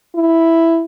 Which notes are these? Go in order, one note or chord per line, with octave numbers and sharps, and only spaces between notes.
E4